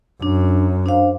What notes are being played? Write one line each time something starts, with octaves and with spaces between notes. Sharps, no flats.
F#2 D4
D4 C5 F5